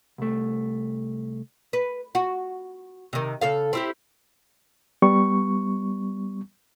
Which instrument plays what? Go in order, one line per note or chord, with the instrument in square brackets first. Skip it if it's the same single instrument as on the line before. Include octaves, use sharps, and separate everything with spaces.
[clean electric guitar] C2 A3
[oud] B4
F#4
C3 D#3
C#3 A4 F5
C4 E4 G4
[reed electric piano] G3 B3 C#6